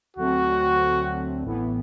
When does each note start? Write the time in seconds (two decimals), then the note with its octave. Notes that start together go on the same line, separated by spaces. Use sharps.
0.16 D2 D3 F#3 A3 C4 F#4
1.42 A1 A2 E3 B3